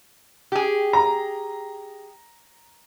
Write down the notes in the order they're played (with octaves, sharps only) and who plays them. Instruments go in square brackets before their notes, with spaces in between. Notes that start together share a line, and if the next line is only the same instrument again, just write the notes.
[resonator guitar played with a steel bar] G4 G#4
[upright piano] A#5